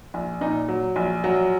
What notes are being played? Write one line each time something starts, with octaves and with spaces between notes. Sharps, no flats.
A#1
A#2 D#4
F#3
A#1
F#3